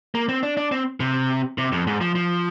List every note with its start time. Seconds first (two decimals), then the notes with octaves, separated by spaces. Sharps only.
0.15 A#3
0.29 C4
0.43 D4
0.57 D4
0.72 C4
1.00 C3
1.58 C3
1.72 F2
1.87 G#2
2.01 F3
2.15 F3